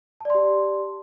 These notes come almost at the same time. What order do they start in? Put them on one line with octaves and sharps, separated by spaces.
A5 D5 C6 G4